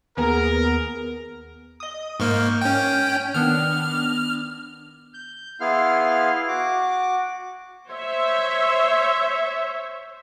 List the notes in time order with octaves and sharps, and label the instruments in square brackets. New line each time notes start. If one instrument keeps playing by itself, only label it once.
[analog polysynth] D#2 B3 G#4 [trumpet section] A#4
[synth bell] D#5 D#6
[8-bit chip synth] G#2 A#3 [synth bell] C#6 F6 G6
[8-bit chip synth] C#4 G5
[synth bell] D#3 B3 D4 [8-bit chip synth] F6
[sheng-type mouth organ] G6
B3 E4 G#4 F5 C6 F6
F#4 D6
[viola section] C5 C#5 E5